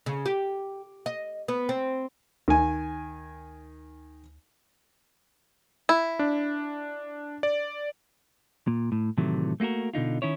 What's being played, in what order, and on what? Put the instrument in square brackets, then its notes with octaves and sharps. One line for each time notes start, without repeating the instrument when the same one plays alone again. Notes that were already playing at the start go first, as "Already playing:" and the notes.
[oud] C#3
G4
D#5
B3
C4
[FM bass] D2 [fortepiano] D#3 G#5
[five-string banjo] E4
[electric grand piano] D4
D5
[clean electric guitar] A#2
A2
A2 C3 D#3 E3 F#3 A3
A3 A#3 F4 F#4 A#4
B2 D3 D#4 F4
D#3 C#4 E4 C#5